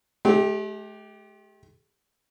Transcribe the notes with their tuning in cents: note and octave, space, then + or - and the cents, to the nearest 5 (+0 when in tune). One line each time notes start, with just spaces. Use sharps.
A3 -45 G4 +0